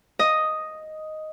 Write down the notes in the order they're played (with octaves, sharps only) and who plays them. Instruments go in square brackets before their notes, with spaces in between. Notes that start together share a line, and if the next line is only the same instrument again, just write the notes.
[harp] D#5